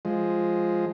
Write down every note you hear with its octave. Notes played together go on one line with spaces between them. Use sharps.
F3 G#3